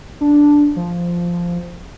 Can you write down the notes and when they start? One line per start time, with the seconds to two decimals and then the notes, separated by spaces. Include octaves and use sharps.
0.21 D4
0.76 F3